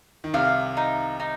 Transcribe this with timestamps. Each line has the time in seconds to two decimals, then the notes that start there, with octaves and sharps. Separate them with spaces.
0.24 D#3
0.33 C2 C3 F5
0.77 D#4
1.20 D#4